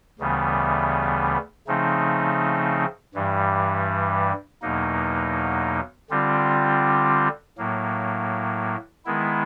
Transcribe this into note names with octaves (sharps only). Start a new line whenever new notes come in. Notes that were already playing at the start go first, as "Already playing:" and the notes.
D2 C#3 E3 G3 B3
C#3 F3 A3 C4 D#4
G2 E3 G3
E2 B2 F#3 A#3 D#4
D3 G3 C4 F4
A2 F#3 A#3
D#3 G#3 B3 E4